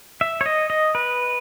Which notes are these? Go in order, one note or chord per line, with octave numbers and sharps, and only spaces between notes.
E5
C#5
D#5
D#5
B4